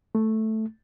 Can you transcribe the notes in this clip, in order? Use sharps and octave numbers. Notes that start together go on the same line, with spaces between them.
A3